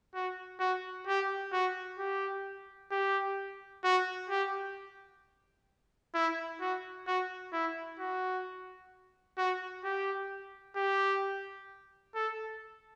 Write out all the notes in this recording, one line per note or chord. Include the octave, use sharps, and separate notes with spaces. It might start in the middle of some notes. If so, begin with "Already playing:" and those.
F#4
F#4
G4
F#4
G4
G4
F#4
G4
E4
F#4
F#4
E4
F#4
F#4
G4
G4
A4